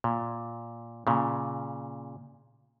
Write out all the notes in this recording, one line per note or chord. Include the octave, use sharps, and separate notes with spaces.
A#2
A#2 C#3